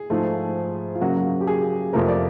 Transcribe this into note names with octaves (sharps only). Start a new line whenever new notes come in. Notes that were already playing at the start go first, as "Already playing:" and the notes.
Already playing: G#4
G#2 F3 A3
F4
C#3 F#3 A#3 F#4
F#4
G4
G#4
F2 C3 F3 A3 C4 A#4
D5